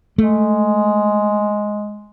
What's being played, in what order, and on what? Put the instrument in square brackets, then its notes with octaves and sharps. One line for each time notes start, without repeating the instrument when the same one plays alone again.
[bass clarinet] G#3 [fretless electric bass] A3